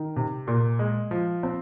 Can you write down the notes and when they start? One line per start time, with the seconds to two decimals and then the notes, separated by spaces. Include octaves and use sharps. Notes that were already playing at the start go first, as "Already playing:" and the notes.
Already playing: D#3
0.16 C3
0.47 A#2
0.79 G#3
1.11 F3
1.43 C4